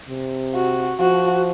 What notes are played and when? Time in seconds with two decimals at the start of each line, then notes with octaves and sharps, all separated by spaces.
0.09 C3
0.55 F#4
1.00 F3 F#4